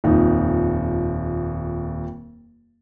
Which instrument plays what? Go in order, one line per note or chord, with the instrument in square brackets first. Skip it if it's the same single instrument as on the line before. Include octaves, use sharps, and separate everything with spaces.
[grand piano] D#1 F2 D#4